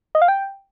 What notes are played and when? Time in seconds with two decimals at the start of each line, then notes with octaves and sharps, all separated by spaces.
0.15 D#5
0.22 F5
0.28 G5